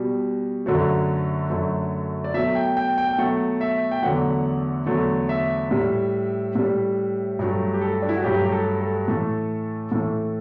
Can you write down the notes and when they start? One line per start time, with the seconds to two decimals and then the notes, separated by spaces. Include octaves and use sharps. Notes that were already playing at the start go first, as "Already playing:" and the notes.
Already playing: B2 G3
0.66 F#2 D3 F#3 A3
1.50 F#2 D3 F#3 A3
2.24 D5
2.34 B2 F#3 A3 E5
2.55 G5
2.77 G5
2.98 G5
3.08 G5
3.18 B2 F#3 A3 F#5
3.61 E5
3.91 G5
4.03 E2 D3 F#3 A3 F#5
4.87 E2 D3 F#3 A3
5.29 E5
5.71 A2 G3
6.55 A2 G3
7.39 G2 F#3 A3
7.74 G4
7.81 A4
8.02 D4
8.09 E4
8.17 F#4
8.23 G2 F#3 A3 G4
8.45 G4
8.52 A4
8.80 A4
9.08 A2 E3 A3
9.92 A2 E3 A3